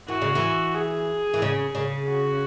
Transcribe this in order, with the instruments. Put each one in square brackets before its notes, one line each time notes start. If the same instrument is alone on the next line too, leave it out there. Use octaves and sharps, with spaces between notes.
[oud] E3 [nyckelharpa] F#4
[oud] C#3
E3
[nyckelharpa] G#4
[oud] E3
C#3
C#3
[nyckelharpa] F#4